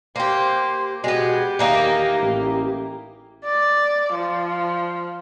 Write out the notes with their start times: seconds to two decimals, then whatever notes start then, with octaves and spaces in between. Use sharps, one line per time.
0.16 A#3 G4 C5
1.04 B2 G#3 B3 F#4 G4
1.59 D#2 E3 A#3 D#4 F5
2.20 A1
3.45 D5
4.14 F3